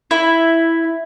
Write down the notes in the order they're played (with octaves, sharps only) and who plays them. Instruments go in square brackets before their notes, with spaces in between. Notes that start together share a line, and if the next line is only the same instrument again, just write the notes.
[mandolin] E4